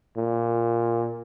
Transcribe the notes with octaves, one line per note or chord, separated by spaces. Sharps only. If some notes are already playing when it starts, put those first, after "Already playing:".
A#2